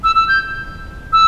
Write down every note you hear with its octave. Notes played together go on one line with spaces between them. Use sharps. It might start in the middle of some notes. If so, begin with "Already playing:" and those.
E6
E6
G6
E6